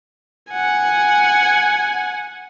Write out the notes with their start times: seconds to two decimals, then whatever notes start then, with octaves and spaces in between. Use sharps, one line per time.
0.51 F#5 G#5